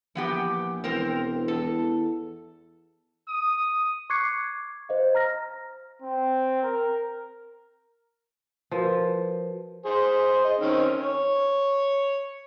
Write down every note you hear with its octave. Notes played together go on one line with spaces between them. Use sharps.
A#1 E3 B3 G4
E1 E3 C4 A#4 C5
E2 A4
D#6
C#6 D6 F#6 G#6 C7 C#7
C5 D#5 F5
A#5 F6 A#6
C4
A#4
F3 F#4 A#4 B4
G#4 C5
D#5
D#3 C4 C#4
C#5